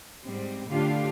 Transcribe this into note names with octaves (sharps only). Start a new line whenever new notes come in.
G#2 G3 C4
A2 D3 D4 F4 G4 F5